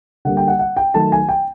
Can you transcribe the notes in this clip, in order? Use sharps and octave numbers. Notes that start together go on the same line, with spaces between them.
D3 G3 A#3 F#5
G5
F#5
F#5
G5
D#3 F#3 A3 A5
G#5
G5